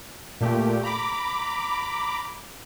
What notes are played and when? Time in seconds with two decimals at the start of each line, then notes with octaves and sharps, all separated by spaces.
0.41 A#2 A3 G4
0.83 A#5 B5 D6